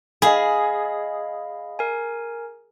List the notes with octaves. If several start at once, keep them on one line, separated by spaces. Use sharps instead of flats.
G#4 D#5 F5 B5
A#4 G#5